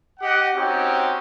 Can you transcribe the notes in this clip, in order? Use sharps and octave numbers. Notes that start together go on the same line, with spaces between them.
G4 D#5 F#5
C4 C#4 D#4 F#4 G4